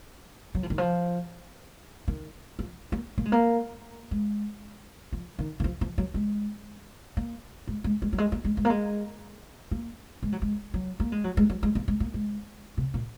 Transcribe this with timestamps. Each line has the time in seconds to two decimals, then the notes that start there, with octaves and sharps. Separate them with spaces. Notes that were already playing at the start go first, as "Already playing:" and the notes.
0.55 F#3
0.63 F3
0.70 D#3
0.78 F3
2.08 D#3
2.59 F3
2.92 A#3
3.18 A#3
3.25 G#3
3.32 A#3
4.11 G#3
5.12 F3
5.39 D#3
5.60 D#3
5.64 F3
5.81 F3
5.98 F#3
6.14 G#3
7.17 A#3
7.68 G#3
7.84 G#3
8.02 G#3
8.13 F#3
8.18 G#3
8.32 A#3
8.44 G#3
8.57 G#3
8.65 A#3
8.70 G#3
9.71 A#3
10.23 G#3
10.32 F#3
10.42 G#3
10.74 F#3
11.00 A#3
11.12 G#3
11.24 F#3
11.37 G#3
11.50 F#3
11.63 G#3
11.75 A#3
11.88 G#3
12.00 A#3
12.14 G#3
12.78 C3
12.94 A#2